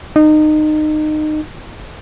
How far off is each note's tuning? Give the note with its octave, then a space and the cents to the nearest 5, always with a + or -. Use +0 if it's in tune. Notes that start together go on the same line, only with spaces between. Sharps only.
D#4 -25